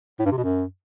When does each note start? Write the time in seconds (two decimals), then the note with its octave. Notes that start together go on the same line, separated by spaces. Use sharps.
0.19 A2
0.25 G2
0.31 C3
0.37 B2
0.44 F#2